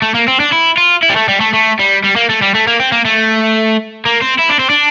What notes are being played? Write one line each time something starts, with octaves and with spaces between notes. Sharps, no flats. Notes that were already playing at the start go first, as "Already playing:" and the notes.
A3
A#3
C4
D4
E4
F4
E4
G3
A3
G3
A3
A3
G3
G3
A#3
A3
G3
A3
A#3
C4
A#3
A3
A#3
C4
E4
D4
C4
D4